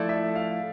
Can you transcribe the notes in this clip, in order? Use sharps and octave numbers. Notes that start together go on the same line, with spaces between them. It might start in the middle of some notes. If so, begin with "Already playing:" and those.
Already playing: F3 A3 E4 A4 D5
E5
F5